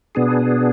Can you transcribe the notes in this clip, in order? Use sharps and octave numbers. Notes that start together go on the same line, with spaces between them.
B2 B3 D4 G#4